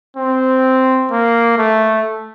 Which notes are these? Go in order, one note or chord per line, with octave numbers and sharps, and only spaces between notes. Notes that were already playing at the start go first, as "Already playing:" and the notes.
C4
A#3
A3